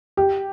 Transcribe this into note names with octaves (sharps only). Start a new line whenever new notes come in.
G4